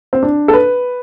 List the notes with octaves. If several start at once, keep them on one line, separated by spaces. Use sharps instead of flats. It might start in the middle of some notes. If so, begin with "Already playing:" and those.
C4
D4
A4
B4